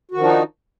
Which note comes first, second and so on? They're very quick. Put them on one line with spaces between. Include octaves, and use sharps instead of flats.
F#4 D#3 F3 D4 D#4